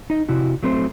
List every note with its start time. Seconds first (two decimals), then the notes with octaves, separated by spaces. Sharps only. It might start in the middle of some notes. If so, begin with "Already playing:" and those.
0.10 D#4 D#5
0.29 C3 E4 F#4
0.63 F#3 A3 C4 B4 C5